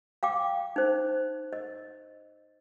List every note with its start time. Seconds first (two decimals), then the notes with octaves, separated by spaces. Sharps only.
0.23 F5 G5 D6
0.76 D#4 C5
1.53 D#5